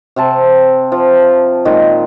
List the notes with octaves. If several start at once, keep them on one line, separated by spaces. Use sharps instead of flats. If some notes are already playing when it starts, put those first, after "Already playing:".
C3 C4 A5
F3
A#2 D#3 G#3